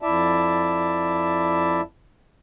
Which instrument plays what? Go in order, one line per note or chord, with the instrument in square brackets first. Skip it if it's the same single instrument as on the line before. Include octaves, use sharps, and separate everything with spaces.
[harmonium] F2 E4 D5 E5 A5